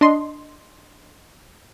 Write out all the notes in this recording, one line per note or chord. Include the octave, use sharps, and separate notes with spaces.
D4 D#5 C6